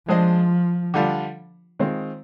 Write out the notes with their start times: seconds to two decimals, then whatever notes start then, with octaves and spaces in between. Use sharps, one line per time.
0.08 F3 G#3 D4 G#4 C5 D#5
0.94 D3 G3 D4 F4
1.79 D#3 G#3 C4 F4